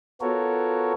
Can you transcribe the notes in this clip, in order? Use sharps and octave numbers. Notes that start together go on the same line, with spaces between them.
B3 F4 F#4 A4 A#4 C#5